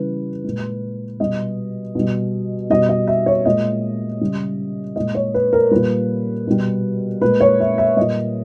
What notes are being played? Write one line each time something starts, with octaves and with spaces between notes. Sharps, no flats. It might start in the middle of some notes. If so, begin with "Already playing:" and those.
Already playing: C#3 E3 G3 B4
A#2 G#3
B2 G3 D#5
B2 G3
B2 G3 D#5
D#5
E5
C#5
A#2 G#3 D#5
C#3 G3
A#2 G#3 D#5
C#5
B4
A#4
A#2 G3 B4
B2 G3
A#2 G#3 B4
C#5
E5
E5
A#2 G3 D#5